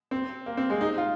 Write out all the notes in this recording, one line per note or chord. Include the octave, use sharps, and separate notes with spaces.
C4
A#3
C4
G#3
D#4
F4